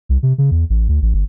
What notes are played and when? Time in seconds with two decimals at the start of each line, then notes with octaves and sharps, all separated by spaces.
0.09 C2
0.23 C3
0.38 C#3
0.51 E2
0.70 A1
0.89 D2
1.02 A1
1.14 G1